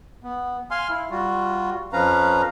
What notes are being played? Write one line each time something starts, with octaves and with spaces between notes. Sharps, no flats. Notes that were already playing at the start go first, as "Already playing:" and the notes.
B3
F5 G#5 C6 F6
E4
G3 F4 F#4
F2 F3 C#4 B4 F5 A#5